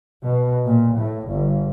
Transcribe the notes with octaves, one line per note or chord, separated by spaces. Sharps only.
B2
A#2
A2
G1